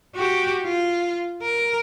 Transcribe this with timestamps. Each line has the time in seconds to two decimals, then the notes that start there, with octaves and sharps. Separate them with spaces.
0.16 F#4 G4
0.62 F4
1.42 A#4